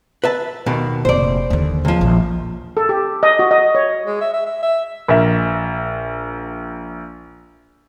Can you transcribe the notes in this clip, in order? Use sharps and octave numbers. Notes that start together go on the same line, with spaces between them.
B4 E5 A5
D#2 B2 D#3
F1 A#2 C5 D5
D#2 D3
C#2 F3
A#1
A4
G4
D#5
F#4
D#5
C#5
G#3
E5
E5
E5
E5
A#1 A#4 E5